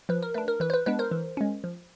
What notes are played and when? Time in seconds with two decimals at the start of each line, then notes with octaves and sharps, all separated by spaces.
0.09 F3 B4
0.23 A#4
0.34 A3 D4 B4
0.48 A#4
0.60 E3 B4
0.70 C5
0.74 B4
0.86 G#3 B3 D4 B4
0.99 A#4 C5
1.11 E3
1.37 G#3 C#4
1.64 F3